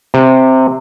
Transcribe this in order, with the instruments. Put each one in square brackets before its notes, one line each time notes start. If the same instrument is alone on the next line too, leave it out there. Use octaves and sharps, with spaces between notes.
[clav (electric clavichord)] C3